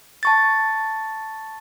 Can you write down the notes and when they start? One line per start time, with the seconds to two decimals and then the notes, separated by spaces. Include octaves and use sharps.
0.23 A5 C#6 A6